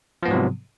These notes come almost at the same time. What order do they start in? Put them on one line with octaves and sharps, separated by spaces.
F3 B3 G#2 F#3 C3